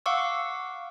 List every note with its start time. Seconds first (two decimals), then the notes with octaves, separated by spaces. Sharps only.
0.06 F5 F#5 C#6 D6 E6